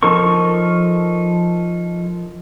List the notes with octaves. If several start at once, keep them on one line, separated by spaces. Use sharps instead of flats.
F3 D#4 A4 A#4 C#6